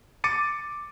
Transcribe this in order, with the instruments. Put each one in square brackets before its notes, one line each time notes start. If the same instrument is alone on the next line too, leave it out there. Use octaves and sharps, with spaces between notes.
[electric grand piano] D6 A6 C#7 D#7